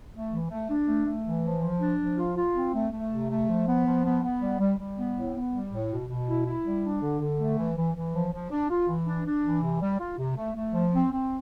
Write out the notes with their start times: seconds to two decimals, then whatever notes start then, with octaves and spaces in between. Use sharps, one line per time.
0.13 A3
0.31 E3
0.50 A3
0.69 D4
0.87 A3
1.06 A3
1.25 E3
1.43 F3
1.62 F3
1.80 D4
1.99 F3
2.17 F4
2.36 F4
2.54 C4
2.74 A3
2.92 A3
3.11 C3
3.29 A3
3.48 F3
3.67 B3
3.86 F3
4.04 B3
4.23 B3
4.41 G3
4.59 G3
4.78 G3
4.97 B3
5.15 A2
5.35 B3
5.52 G3
5.71 A2
5.90 B2
6.09 B2
6.28 E4
6.46 E4
6.65 G3
6.83 D4
7.01 D3
7.20 D3
7.39 A3
7.58 E3
7.77 E3
7.95 E3
8.13 F3
8.32 F3
8.51 D4
8.70 F4
8.88 E3
9.06 D4
9.26 D4
9.44 E3
9.62 C3
9.81 G3
9.99 F4
10.18 C3
10.36 A3
10.55 A3
10.73 F3
10.93 C4
11.12 C4